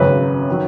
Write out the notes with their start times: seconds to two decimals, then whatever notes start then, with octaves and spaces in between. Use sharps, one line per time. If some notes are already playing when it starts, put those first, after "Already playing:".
Already playing: G#1 F#2 C#3 F#3 B4
0.50 D#3 F#3